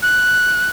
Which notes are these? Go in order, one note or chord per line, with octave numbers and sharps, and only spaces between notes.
F#6